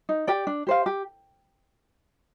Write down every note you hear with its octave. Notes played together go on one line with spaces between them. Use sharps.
D#4
G4 D5 G5
D4
G4 C5 F5
G4